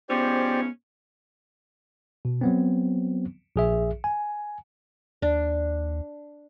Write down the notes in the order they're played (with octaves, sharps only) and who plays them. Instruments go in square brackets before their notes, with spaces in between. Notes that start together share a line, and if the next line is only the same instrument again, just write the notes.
[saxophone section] G#2 F3 C#4 [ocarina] B3 [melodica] G4 C5 D5
[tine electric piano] B2
F#3 B3 C4
A#1 G#4 E5
G#5
[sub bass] D#2 [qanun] D4